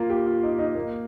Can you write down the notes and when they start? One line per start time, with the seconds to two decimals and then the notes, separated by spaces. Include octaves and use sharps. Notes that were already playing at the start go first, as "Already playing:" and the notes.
Already playing: A#3 F4
0.10 G4
0.26 F4
0.43 D#4
0.59 D#4
0.75 A#3